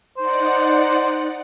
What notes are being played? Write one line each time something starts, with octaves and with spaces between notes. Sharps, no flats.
D#4 C5 D5 F#5